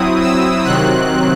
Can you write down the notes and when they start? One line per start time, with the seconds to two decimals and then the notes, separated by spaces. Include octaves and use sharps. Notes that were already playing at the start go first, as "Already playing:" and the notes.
Already playing: F#3 C4 E4 D#6
0.20 E6
0.64 C3 D#3 F#3 C4 F#6